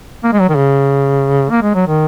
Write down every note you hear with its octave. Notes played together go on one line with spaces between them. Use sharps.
A#3
G#3
F#3
D#3
C#3
A#3
G#3
F#3
D#3